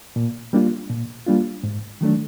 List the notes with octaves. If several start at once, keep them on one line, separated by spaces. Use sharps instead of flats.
A#2
G3 A#3 D4 F4
A#2
G3 A#3 D4 F4
G#2
D#3 F#3 A3 D4